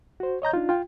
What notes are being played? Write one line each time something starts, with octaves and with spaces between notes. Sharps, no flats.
F#4 C5
C#5 D#5 A#5 G6
D4 D#4 F4
F4 G5